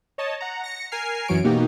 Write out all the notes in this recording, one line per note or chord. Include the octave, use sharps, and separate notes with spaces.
C#5 D#5 A5
F#5 A#5
A#6 C#7
A#4 G#5 F6 C7
F#2 E3 F#3 C#5 D7
B2 A#3 D#4 F#4 G4